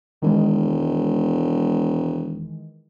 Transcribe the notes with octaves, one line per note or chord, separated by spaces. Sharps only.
E1 D#3 E3 G#3